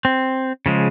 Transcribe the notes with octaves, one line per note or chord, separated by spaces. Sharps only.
C4
C#3 F3 G#3